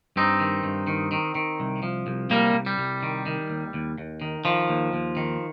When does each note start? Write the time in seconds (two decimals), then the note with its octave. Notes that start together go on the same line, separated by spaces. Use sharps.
0.16 G2 C4 D#4
0.40 D#3
0.64 G2
0.87 D#3
1.12 D#3
1.35 D#3
1.60 C2
1.83 F3
2.07 C2
2.30 C2 G3 A#3
2.54 C2
2.66 G3
2.78 C2
3.03 D#3
3.26 D#3
3.50 D#2
3.74 D#2
3.98 D#2
4.22 D#3
4.45 D#3 F3
4.69 D#2
4.93 D#2
5.17 D#3